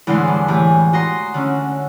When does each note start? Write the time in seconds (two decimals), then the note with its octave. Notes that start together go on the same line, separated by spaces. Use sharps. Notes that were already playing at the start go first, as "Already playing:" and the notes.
0.07 E2 A2 D3 E3 G#3 C6
0.28 G2
0.48 A2 E3 G4 G#5
0.93 F#4 D#5 A#5 C6
1.34 D3 C#4